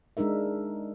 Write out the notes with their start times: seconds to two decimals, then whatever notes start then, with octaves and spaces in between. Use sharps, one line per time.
0.17 G#3 D4 D#4 A#4 E5